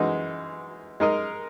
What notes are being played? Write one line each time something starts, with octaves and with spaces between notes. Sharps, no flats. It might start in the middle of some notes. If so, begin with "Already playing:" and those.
Already playing: F#2 E3 G#3 D#4 F#4
G#3 D#4 A#4 D#5